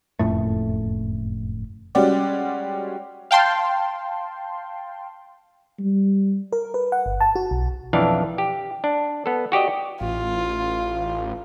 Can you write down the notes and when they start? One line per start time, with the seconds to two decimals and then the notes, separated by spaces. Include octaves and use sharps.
0.19 F#1 F2 A2 A3
1.95 G3 G#3 C#4 F#4 G4 D5
3.31 F5 G5 A5 C6
5.79 G3
6.53 A#4
6.74 B4
6.92 F#5
7.06 G1
7.21 A5
7.36 F#4
7.51 B1
7.93 B1 F2 E3 D4 F5
8.38 G4
8.84 D4
9.26 B3 A4
9.52 F#4 G4 D5 D#5
10.01 A1 F4